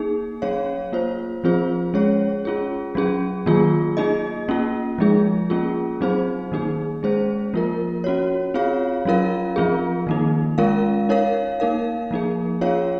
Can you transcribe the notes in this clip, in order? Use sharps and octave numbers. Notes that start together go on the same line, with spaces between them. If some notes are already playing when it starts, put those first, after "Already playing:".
Already playing: A#3 D#4 G#4
F#3 C#4 G#4 C#5 F5
A#3 F4 C5
F3 C4 F4 G#4 C5
G#3 C#4 G#4 C#5
C#4 F4 G#4
F#3 C#4 G#4
D#3 F#3 A#3 F4 G#4
A#3 D#4 G#4 D#5
A#3 C#4 F4
F3 G#3 D#4 G#4
A#3 C#4 F4 G#4
F#3 C4 D#4 G#4 C5
D#3 A#3 D#4 G#4
G#3 C#4 G#4 C5
F3 A#3 F4 A#4
C#4 F#4 C#5
C4 F4 G#4 C#5 F5
F#3 C#4 F4 A#4 F5
F3 C4 F4 G#4
D#3 A#3 D#4
G#3 C#4 F4 A#4 F5
D#4 A#4 C#5 F5
A#3 D#4 A#4 F5
F3 A#3 D#4 G#4
C#4 F4 G#4 C#5 F5